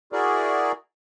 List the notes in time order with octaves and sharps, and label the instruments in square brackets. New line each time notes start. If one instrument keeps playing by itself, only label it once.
[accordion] E4 F#4 G#4 A#4 D5